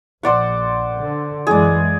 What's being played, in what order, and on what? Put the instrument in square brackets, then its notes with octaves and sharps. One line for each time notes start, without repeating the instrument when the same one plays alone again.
[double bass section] A#1 [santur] C5 D5 F#5
[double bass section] D3
[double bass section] F#2 E3 G#3 [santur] G#4 D5